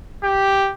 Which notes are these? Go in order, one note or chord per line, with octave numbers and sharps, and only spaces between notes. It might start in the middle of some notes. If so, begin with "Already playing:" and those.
G4